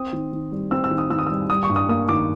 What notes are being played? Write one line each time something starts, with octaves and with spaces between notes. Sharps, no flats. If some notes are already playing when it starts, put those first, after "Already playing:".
Already playing: C4 D#6
D#3
D#3
G3
C4 E6
E6
D#3
D#6
D#3 E6
D#6
G3 E6
G3 D#6
C#6
G2
D#6
A#3 D#6
D#3 D6